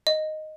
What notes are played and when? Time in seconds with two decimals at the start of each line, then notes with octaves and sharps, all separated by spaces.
0.07 D#5